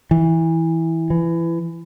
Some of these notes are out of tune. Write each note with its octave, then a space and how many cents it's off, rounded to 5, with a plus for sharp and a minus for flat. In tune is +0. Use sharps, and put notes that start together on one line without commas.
E3 -15
E3 +20